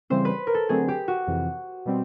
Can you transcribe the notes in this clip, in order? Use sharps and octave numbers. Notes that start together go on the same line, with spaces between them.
C#3 E3 G3 C4 C5
B4
A#4
A4
D3 F#3 A3 C4 G#4
G4
F#4
F2 C3 E3
B2 G3 C4